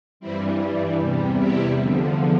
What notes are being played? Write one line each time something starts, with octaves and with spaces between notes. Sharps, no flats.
G2 E3 G3 C4 E4
E2 C3 G3
E4 G4
E2 D3 F3